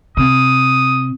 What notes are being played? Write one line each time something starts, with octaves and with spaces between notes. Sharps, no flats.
C3 D#6